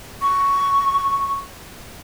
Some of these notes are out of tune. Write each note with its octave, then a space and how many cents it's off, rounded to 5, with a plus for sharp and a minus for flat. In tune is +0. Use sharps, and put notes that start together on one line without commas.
C#6 +5